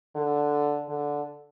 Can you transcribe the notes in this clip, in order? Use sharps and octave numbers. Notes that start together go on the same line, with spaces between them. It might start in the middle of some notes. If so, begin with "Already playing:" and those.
D3
D3